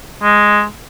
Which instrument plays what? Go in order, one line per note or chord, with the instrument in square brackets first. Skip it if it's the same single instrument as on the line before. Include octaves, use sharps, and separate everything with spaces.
[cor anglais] G#3